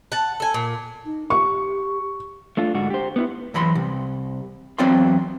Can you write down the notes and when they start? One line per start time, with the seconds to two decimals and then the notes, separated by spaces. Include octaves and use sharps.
0.12 F#5 A5
0.40 A4 G#5
0.54 A#2
1.05 D#4
1.30 G4 C#6
2.57 A3 D4 F4
2.74 G#2 D3 F#4
2.90 G4 C5
3.16 B3 D#4 E4
3.54 F#2 E3 B5 C6
3.75 C2
4.78 E2 F#3 C4 D5 F5 C6